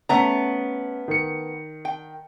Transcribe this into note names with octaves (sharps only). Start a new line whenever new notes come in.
A3 B3 C#4 A#5
D#3 C#7
G5